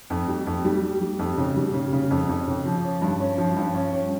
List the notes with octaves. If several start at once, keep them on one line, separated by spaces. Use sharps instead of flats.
F2
G3
F2
G3
G3
G3
F2
C#3
G3
C#3
C#3
F2
F2
C#3
F3
C#4
G2
C#4
F3
G2
C#4
C#4